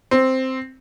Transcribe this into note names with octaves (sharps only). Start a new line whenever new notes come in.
C4